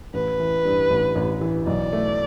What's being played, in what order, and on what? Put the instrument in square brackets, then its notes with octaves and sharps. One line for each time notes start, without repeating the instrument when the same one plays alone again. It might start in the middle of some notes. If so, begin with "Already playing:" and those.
[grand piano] A1 [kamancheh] B4
[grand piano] E3
G2
A1
A1
E3
[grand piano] B1 [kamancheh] D5
[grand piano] A3